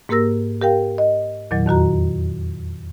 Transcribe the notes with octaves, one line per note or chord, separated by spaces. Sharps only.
G#2 A#3 G4 A#4 E6 A#6
G4 A#4 F5 G5
D#5
E2 A#2 D#3 F#3
F2 D#3 F#4 A#5